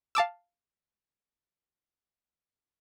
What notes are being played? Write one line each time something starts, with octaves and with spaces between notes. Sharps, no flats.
F5 A5 D6 E6